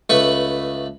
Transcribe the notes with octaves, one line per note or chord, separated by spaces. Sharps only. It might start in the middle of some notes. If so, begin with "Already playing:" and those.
C#2 A3 B4 B5 C#6